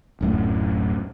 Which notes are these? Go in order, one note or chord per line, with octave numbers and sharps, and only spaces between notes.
D1 F#2 A2